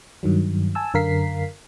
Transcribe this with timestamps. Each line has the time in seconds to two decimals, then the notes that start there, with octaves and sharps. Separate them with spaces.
0.23 G2 D#3 F#3
0.75 G#5 A5 E6
0.94 F#2 D3 A#4 F5 B6 C7